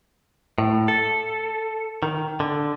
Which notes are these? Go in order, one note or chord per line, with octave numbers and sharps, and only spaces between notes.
A2
A4
D#3
D3